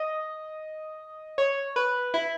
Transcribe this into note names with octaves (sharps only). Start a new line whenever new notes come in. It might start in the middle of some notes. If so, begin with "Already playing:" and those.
Already playing: D#5
C#5
B4
E4